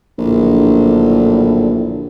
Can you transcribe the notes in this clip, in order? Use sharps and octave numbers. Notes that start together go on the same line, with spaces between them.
A#1 F#2 A2 D3